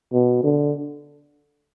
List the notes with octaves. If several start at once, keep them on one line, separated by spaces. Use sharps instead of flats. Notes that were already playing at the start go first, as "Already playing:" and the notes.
B2
D3